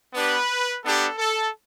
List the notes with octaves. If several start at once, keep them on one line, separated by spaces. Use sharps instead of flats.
B3 D4 G4 B4
B3 D4 G4 A4
A4